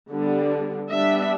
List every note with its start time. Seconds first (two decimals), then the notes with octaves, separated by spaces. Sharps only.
0.11 D3 G3 B3 D4
0.90 G3 B3 D4 E5